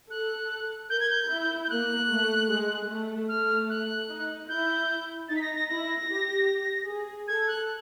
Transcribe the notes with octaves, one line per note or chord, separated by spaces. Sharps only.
A4 F#6
A#4 G6
G#6
G6
E4
G6
A#3 F#6
A3
G#3
A3
A3 F6
F#6
D#4
E4 G6
D#4 A6
B6
A#6
A#6
E4 A#6
G4
G#4
A4 G#6
F#6